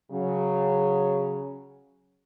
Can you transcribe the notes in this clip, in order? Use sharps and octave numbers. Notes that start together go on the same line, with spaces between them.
C#3 F#3